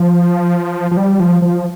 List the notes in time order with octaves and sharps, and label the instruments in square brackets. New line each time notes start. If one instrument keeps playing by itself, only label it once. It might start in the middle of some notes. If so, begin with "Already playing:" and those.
Already playing: [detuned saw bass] F3
F3
G3
F3
F3